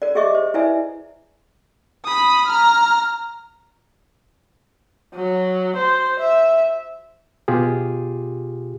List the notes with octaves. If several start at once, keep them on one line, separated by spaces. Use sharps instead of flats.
A#4 D5
G4 G#4 D#5 E5 C#6 D6
C5
E4 B4 D5 E5 G#5
B5 D#6
A#5 F6
F#3
C5
E5
B2 F4 G4 G#4